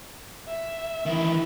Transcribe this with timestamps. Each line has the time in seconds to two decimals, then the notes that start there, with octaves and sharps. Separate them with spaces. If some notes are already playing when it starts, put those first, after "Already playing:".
0.48 E5
1.06 D#3 E3